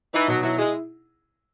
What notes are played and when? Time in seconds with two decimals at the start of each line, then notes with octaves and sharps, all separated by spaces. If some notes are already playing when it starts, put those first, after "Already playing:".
0.14 E3 D#4
0.28 B2 F#3
0.43 F#3 E4
0.58 G#3 G#4